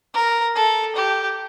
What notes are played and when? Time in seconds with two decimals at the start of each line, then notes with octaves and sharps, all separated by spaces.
0.14 A#4
0.55 A4
0.96 G4